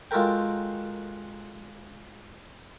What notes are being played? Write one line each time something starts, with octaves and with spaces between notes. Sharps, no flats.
G#3 F4 F#4 A4 A#4 G5